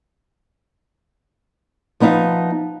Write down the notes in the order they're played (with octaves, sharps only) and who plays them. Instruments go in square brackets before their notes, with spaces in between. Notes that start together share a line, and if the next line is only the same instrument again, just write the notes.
[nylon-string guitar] F3 B3 D#4 E5 F5